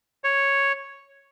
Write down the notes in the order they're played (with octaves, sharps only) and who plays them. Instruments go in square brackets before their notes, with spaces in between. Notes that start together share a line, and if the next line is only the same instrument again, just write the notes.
[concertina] C#5